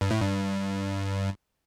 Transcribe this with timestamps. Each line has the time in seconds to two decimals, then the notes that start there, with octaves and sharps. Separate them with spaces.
0.01 G2
0.11 A2
0.21 G2